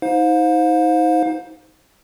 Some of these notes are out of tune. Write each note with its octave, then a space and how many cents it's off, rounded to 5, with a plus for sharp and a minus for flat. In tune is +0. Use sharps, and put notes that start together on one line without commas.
D#4 +30 C5 +0 F5 +35